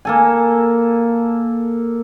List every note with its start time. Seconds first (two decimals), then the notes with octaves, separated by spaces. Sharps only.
0.05 A#3 A4 G#5